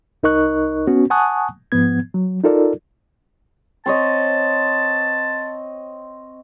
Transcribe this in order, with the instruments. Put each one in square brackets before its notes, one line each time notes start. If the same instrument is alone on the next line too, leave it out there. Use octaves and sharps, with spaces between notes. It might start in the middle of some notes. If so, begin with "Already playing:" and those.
[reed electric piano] C2 D#4 A#4 D#5 C#6 F#6
B3 C#4 F#4
F#5 G#5 A5 C#6 D#6 F#6
G#2 F3 B3 G#6
F#3
D#4 F4 A4 A#4 D5
[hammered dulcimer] C4 C#5 D#5 [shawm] A5